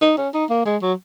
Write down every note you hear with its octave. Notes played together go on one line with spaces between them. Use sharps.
D#4
C#4
D#4
A#3
G#3
F#3